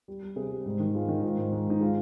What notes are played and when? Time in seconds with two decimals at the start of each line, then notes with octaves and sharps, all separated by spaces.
0.08 G3
0.22 G3
0.36 C3 G#4
0.50 G3
0.66 G#2
0.79 D#3
0.95 G#3 F4
1.08 D#3 D#4
1.23 G#2 F4
1.38 G#2
1.52 G#2
1.67 G#2 D#4
1.81 G#3 F4